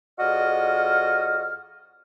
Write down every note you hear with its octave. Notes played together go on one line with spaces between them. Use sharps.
F2 F#4 G#4 D5 D#5 F6